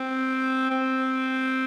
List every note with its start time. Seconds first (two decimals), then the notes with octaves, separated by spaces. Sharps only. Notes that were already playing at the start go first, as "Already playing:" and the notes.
Already playing: C4
0.71 C4